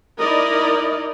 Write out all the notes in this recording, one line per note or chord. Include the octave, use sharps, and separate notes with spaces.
D#4 E4 A#4 D5 D#5